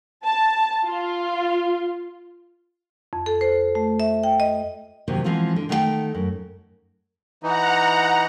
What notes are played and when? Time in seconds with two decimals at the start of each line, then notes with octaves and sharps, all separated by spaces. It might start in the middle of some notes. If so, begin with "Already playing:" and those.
0.24 A5
0.85 F4
3.13 F2
3.26 A4
3.41 C5
3.75 A3
4.00 E5
4.23 G5
4.40 D#5
5.08 C3 D#3 E3 F#3 A#3
5.24 E3 F3 G#3 B3 C4 F4
5.56 D3
5.69 D#3 A3 D#4 E4 F#5 G5
6.15 F#2
7.43 E3 D#4 F#5 A#5